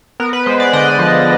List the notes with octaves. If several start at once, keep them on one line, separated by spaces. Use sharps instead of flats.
B3 A#4
B4
G#3 C5
D5
D3 D#5
F3